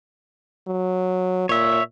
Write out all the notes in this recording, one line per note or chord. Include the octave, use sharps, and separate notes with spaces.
F#3
A#2 C#5 E5